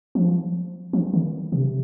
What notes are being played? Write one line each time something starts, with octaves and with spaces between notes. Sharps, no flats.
F3
F3
D#3
C3